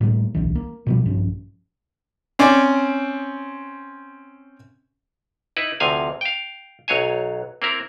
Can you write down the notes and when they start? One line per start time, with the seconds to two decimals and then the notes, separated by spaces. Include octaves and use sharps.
0.01 A2 G3 A3 A#3
0.35 D1 B1 E3
0.55 A#3
0.87 B2 F3 G3
1.06 A#1 G2 F3 C#4
2.39 C4 C#4 D5
5.57 D#4 E4 B4
5.80 D2 C3 F3 F5 G#5
6.21 F5 G5
6.88 B1 F#3 C#5 F5 G#5
7.62 A#3 C4 E4 A#4